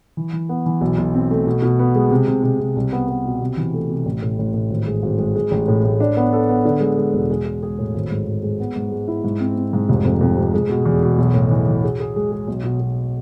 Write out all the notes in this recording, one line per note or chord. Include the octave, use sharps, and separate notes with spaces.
E3
E3
B3
E3
B1
B1
C4
A3
B2
B2
B3
G#3
C3
C3
C3
C3
C2
B3
B3
B2
C3
E3
A3
C3
A1
A2
A1
A2
G#1
G#3
G#1
G#3
G#3
A1
A2
A2
D4
B3
A4
B3
D3
G#3
G#3
E1
G#3
G#3
G#4
A2
G#1
G#2
G#1
G#3
B3
G#2
G#3
E4
G#2
C4
C4
G#2
F1
F2
F2
C3
G#3
B2
E2
B2
B1
A2
E3
E3
G#4
G#4
G#3
G#4
B1
B2
B2